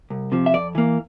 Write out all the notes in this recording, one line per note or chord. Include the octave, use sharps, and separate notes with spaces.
C2
C3 F3
E5
F2 D5
E3 A#3